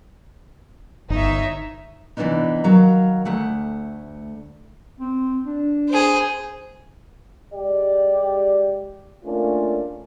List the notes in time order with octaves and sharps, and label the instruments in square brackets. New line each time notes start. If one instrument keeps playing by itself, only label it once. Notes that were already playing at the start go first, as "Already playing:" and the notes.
[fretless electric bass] G1 [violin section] D#4 C#5 E5
[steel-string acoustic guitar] C3 E3 F3 B3 D4 D#4
D#3 F#3 A#4 F5 A#5
D2 A3 F#5
[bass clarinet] C4
D4
[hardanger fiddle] G#4 C5
[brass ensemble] G#3 G4 D5
A3 A#3 C#4 D4 F4 A#4